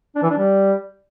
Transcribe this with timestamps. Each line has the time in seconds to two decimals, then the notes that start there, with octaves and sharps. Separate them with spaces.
0.15 D4
0.23 E3
0.30 D4
0.37 G3